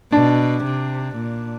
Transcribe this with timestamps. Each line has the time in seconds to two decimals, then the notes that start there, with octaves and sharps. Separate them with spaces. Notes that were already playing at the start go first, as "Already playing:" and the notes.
0.12 B2 D4
0.64 C3
1.16 A#2